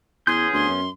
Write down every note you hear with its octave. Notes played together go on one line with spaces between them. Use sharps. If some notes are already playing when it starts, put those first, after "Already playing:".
E2 B3 C#4 G#4 C6 G6
D2 C6
F#2